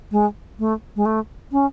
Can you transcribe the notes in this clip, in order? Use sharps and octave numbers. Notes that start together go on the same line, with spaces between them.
G#3
A3
G#3
A3
C#4